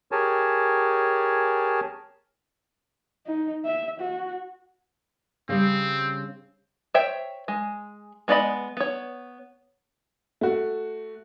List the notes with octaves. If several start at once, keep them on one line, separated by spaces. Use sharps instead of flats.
G4 G#4 A#4 C#5 G#5 A5
D#4
E5
F#4
C#3 G3 C4
C5 C#5 E5 G5
G#3
G#3 B3 D5 D#5 B5
B3 C#5
A3 F#4